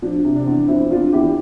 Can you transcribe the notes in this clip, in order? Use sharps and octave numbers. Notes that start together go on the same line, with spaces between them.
F3 D4
C3
D4
E2
F3 C4 E4
E2 D4 F4
E2 E4 G4